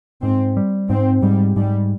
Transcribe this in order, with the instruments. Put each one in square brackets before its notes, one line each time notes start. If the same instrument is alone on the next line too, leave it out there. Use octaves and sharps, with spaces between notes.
[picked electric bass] G#2 [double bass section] C4
[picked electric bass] G3
[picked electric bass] G#2 [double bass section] C4
[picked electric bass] G#2 [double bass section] G3
[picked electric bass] G#2 [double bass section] G3